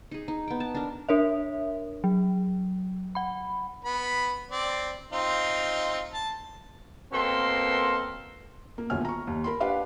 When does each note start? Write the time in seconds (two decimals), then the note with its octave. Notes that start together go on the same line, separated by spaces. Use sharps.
0.11 D#4 G#4
0.28 D#4
0.48 B3 G5
0.60 A5
0.75 D4 A#4
1.09 D4 A#4 C#5 E5
2.04 F#3
3.15 F#5 B5
3.85 B3 B5
4.51 C4 D5
5.12 C4 D#4 F4
6.12 A5
7.12 B2 A#3 C4 A4 A#4 C6
8.78 A#3
8.90 D#1 D2 B2 C#5 G#5 F6
9.05 A#5 C#6
9.27 D#2
9.44 A#4 B5 C6
9.60 D4 G4 B4 F5 F#5